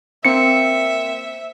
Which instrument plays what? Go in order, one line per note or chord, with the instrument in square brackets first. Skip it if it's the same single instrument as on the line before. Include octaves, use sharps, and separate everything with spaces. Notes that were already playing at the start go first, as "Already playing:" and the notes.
[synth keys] A#3 C4 [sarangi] E5 [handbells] C#7